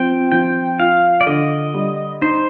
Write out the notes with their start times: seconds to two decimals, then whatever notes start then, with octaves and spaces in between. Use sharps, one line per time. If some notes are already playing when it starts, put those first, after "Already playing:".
Already playing: F3 C4 G5
0.32 F3 G5
0.80 F4 F5
1.21 D5
1.26 D3 D#5
1.74 G3
2.21 D#4 C5